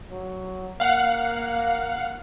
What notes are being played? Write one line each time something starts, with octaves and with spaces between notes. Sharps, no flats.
F#3
A#3 F5 F#5